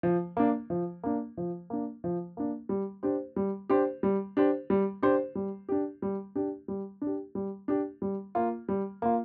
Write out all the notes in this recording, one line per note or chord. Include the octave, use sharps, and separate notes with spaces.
F3
A#3 D4
F3
A#3 D4
F3
A#3 D4
F3
A#3 D4
G3
D4 G4 C5
G3
D4 G4 C5
G3
D4 G4 C5
G3
D4 G4 C5
G3
D4 G4
G3
D4 G4
G3
D4
G4
G3
D4 G4
G3
A#3 F4
G3
A#3 F4